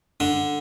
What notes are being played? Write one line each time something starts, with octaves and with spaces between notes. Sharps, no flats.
D3